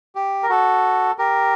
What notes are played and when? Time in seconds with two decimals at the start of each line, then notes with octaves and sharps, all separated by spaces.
0.15 G4
0.43 A#4
0.49 F#4 A4
1.18 G4 A#4